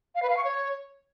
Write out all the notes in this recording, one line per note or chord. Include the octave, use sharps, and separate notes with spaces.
F5
B4
F5
C#6
C#5